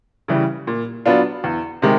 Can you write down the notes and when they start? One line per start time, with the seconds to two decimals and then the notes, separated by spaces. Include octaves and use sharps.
0.28 C#3 E3 G3
0.67 A#2
1.06 F#3 B3 D4 F4
1.44 E2
1.82 C3 D#3 G#3